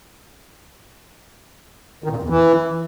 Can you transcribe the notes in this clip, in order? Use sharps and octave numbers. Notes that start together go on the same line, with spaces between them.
D#3
A#2
F2
E2
E3